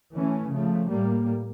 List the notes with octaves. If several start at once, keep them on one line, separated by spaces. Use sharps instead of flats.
E3 A3 C#4
C#3 F3 A3
A2 G3 A#3